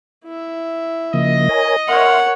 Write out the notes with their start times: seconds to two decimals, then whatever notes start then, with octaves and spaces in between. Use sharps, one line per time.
0.25 E4 E5
1.14 C#3 F3 A#3 D#5
1.49 A#4 C#5 G#5
1.89 A#4 C#5 E5 F#5 C6 F6